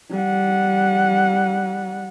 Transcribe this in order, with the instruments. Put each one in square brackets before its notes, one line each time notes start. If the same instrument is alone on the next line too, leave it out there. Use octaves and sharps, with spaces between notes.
[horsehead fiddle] G3 F#5